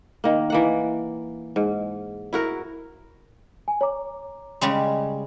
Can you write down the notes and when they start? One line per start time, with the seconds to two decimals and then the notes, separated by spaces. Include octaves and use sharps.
0.24 D#3 A#3
0.50 E3 A#3 F#5
1.56 G#2
2.33 E4 F#4 A#4
3.68 G#5
3.81 C#5 A#5 D6
4.61 C#3 G3 G#3